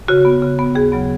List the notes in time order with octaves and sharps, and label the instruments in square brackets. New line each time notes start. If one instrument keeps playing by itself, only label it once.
[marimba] C#3 F#4
B3
C#3
B3
D#2 G#4
C#3 F#3 B3